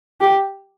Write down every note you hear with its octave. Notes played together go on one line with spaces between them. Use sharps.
G4